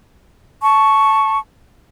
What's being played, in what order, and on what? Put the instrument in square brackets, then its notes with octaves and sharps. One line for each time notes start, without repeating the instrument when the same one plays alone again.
[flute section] A5 C#6